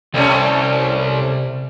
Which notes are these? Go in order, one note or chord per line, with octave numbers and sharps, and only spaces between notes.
C2 C3 G3 A3 C#4 D5